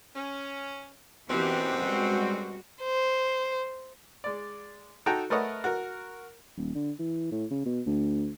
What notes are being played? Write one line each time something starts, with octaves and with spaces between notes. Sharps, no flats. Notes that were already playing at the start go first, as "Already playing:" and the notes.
C#4
F#2 B2 E3 B3 C4 G4
G3 G#3 F#4
C5
G#3 D5
D#4 F#4 A4 G5 A5 A#5
A3 A#4 B4 C#5 D#5 F#5
F#4 A#4
D#1
D3
E3
A2
C#3
B2
D2